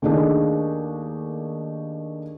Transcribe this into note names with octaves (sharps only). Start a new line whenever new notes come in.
D#2 A3 D4 D#4 G#4